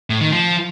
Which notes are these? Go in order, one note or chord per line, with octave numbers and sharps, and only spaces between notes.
A2
D#3
F3